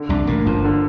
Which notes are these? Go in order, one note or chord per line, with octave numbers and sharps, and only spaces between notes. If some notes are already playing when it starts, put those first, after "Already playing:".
Already playing: D3
C2 C3 D4
A1 A2 A#3
G1 G2 F3
D3